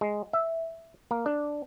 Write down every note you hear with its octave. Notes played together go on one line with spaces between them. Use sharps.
G#3
E5
A#3
D4